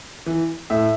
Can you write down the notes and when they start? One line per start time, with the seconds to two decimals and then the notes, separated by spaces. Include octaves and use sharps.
0.26 E3
0.70 A2 E5